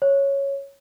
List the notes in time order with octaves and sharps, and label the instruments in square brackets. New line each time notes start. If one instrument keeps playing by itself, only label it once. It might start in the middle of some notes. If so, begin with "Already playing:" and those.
[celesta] C#5